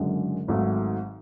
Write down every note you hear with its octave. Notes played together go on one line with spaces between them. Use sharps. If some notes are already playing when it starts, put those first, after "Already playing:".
Already playing: F#1 F#2 D3 G#3
G#1 G#2 F#3 A3